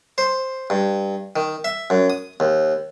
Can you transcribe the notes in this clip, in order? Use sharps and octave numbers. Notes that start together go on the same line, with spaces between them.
C5
G2
D#3
E5
F#2
D#6
D#2